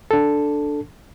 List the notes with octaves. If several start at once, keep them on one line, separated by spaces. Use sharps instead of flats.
D4 A4